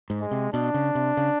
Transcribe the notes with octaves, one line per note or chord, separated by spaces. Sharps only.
G#2
G#3
C3
B2 D4
C#3
C3
C#3